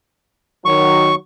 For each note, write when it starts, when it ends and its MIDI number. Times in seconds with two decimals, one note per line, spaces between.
0.65 1.11 51
0.65 1.11 54
0.65 1.15 85